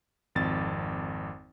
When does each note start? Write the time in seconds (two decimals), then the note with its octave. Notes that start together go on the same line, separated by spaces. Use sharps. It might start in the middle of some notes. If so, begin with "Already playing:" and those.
0.35 G#1 F2 A6